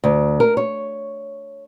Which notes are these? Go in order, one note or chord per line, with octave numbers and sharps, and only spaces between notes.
D2
A#4
C#5